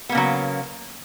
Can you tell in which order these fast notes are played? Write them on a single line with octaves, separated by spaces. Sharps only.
B3 A#3 C#3 F#3